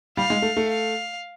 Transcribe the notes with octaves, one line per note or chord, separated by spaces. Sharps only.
G3 F5
G#3
A3
A3
F5